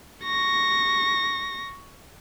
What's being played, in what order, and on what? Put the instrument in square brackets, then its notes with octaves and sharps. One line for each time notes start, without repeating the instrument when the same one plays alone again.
[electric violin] C#6 A#6